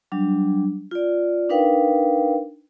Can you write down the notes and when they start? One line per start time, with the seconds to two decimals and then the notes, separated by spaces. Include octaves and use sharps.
0.12 F#3 G3 D4
0.91 F4 D5
1.49 D4 D#4 A#4 B4 F5 G5